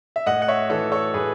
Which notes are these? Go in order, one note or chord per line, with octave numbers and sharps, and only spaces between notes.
E5
A2 D#5 F#5
F#5
C#5 E5
E3 A4 C#5
A4 C#5
A2 G#4 B4